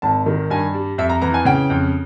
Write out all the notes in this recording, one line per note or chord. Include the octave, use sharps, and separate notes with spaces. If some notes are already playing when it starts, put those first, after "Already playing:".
G#1 A5
D#3
G2 G#5
G3
F2 E5
A#5
E3 A#5
G#5
C#3 G5
F2